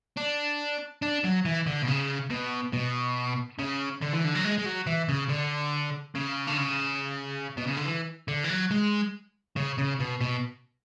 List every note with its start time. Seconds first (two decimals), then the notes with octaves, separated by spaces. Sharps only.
0.17 D4
1.02 D4
1.24 F#3
1.45 E3
1.66 D3
1.83 B2
1.88 C#3
2.30 B2
2.73 B2
3.59 C#3
4.01 D3
4.13 E3
4.24 D3
4.35 F#3
4.44 G#3
4.58 G#3
4.65 F#3
4.87 E3
5.09 C#3
5.29 D3
6.15 C#3
6.47 D3
6.57 C#3
7.57 B2
7.67 C#3
7.77 D3
7.85 E3
8.28 D3
8.44 E3
8.50 F#3
8.71 G#3
9.56 C#3
9.78 C#3
10.00 B2
10.21 B2